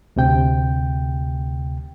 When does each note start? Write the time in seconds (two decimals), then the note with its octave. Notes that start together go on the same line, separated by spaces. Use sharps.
0.16 D2 C3 G5